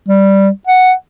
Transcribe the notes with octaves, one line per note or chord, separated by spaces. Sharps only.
G3
F#5